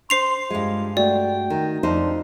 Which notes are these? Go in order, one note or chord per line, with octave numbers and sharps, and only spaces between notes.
C5 C6 C7 F7
G2 G#3 F4
A3 F#4 D5 G5
D#3
F2 D4 D#4 C5